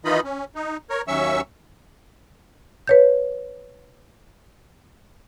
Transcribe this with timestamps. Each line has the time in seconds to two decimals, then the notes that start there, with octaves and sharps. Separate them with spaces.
0.05 D#3 E3 D#4 F4 D#5 B5
0.24 C#4
0.55 D#4
0.90 A#4 C#5
1.08 D#2 F#3 C#4 E5 C#6 E6
2.87 B4 C#5 G6